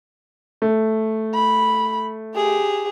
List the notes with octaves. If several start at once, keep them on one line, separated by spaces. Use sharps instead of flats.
A3
B5
G4 G#4